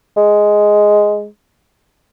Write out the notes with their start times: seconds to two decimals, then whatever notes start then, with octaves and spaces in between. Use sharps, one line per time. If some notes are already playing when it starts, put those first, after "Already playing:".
0.17 G#3